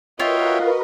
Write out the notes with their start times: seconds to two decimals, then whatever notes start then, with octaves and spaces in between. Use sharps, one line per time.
0.20 F4 F#4 A#4 B4 C#5 D#5 E5 G5